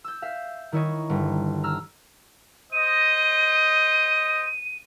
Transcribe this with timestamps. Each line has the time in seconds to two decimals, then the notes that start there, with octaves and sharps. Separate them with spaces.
0.04 E6 G6
0.22 E5 F5
0.72 D#3 E4 C#5 D#5
1.09 G1
1.63 A#5 E6 F6
2.73 C5 D#5 D#7